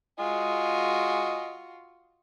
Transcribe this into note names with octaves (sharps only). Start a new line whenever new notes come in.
F4 F#4 D#5 G#5